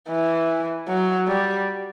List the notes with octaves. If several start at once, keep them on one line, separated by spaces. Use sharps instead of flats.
E3
F#3
G3